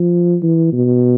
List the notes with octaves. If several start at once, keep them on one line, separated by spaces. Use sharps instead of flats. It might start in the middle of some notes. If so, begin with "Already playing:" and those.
Already playing: F3
E3
B2